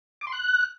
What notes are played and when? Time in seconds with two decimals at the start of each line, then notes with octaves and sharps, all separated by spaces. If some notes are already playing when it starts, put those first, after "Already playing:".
0.21 D6
0.27 C6
0.32 F#6